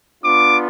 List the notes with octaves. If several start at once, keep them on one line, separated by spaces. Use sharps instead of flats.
B3 D4 F4 D6